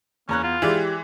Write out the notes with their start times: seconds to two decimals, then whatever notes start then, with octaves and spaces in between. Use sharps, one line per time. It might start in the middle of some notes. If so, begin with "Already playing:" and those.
0.29 E2 A#3 C#4 A#5 F#6
0.43 B3 F4
0.62 E3 G#3 E4 G4 D5